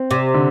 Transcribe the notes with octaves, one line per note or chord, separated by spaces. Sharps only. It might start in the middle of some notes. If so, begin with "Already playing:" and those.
Already playing: C4
C3
D3